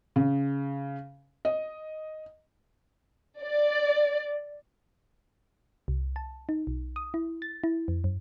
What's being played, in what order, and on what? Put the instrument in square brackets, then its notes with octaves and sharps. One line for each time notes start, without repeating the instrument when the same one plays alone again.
[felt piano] C#3
D#5
[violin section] D5
[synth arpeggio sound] C2
A5
D#4
B1
D#6
E4
A6
E4
F2
F#2